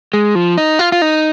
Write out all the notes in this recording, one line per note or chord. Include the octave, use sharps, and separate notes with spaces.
G#3
F3
D#4
F4
F4
D#4